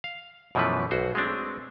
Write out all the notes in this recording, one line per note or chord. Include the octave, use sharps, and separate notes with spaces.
F5
F#2 B2 E3 F3 A3 B4
B1 F#4 C5
G#3 A3 C4 D4